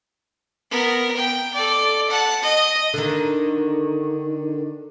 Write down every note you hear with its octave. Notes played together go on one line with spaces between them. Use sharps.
B3 A#4
G5
A4 D5
F#5 A5
D#5
D3 D#3